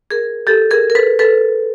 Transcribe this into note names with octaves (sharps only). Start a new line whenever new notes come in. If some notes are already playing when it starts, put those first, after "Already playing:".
G#4 A#4
G4 A4
G#4 A#4
A#4
A4 B4
A4 B4